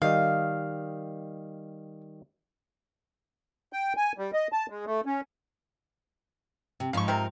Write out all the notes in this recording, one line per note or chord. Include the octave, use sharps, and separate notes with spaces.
D#3 G3 D#5 F5
G5
G#5
G3
D#5
A5
G#3
A3
C#4
C3
G#2 F3 D#4 F5 C#6
C3 C4 A#4